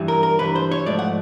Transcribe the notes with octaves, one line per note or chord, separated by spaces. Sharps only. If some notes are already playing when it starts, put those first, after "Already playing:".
Already playing: G2 E3 G3
A#4
A#4
G2 E3 G3 B4
C5
C#5
G#2 F3 A3 D5
F#5